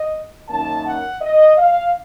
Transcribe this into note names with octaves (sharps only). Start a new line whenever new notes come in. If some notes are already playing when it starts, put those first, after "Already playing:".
Already playing: D#5
F#2 D#3 A#3 C#4 A5
F#5
D#5
F5